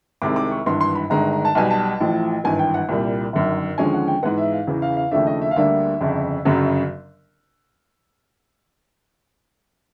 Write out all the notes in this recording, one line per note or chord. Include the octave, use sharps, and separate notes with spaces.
C2 C3 D#3 G#3 D6
D6
C#6
G#1 G2 E3 C6
C6
B5
G1 G2 D#3 G#3 A#5
A#5
A5
B1 B2 G3 G#5
A5
A1 A2 F3
G#1 G2 E3 G#5
G5
F#5
C2 A#2 G3
G1 F#2 D#3
D#2 D3 F3 G#3 C#4 G#5
F#5
G5
G#2 E3 G#3 B3 F#5
E5
F5
E2 C#3 E3
F5
F5
D#2 C#3 F3 A3 D4 E5
D#5
E5
F5
D2 D3 G3 A#3 D4 E5
G1 F2 C#3
G1 F#2 C#3 F#3